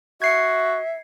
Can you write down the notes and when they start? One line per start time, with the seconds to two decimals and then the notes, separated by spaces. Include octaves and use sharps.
0.22 F#4 E5 G#6 C7 C#7